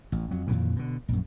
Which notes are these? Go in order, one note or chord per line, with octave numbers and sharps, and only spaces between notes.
A1
F2 F#3
F2 A#2 D#3 E3
B2 D3
A#1 F#2